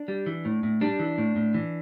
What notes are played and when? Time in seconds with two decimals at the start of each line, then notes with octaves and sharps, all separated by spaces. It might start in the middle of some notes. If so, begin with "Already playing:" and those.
Already playing: D4
0.08 G3
0.26 E3
0.45 A2
0.63 A2
0.81 G3 D4
0.99 E3
1.18 A2
1.36 A2
1.54 E3